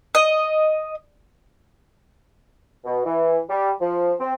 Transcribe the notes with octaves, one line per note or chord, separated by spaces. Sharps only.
D#5
B2
E3
G3
F3
C4